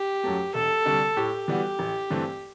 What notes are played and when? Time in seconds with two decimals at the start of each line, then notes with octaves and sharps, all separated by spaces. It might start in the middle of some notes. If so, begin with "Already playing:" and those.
Already playing: G4
0.24 F#2 F#3 A3
0.55 E1 A4
0.86 D2 C3 G3 D4
1.17 A2 G4
1.48 E3 G3 B3 F#4
1.79 A1
2.10 G2 E3 A3 C4